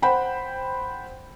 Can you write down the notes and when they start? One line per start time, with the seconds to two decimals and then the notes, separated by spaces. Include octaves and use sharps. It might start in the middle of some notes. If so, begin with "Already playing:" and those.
0.02 C5 F#5 G5 B5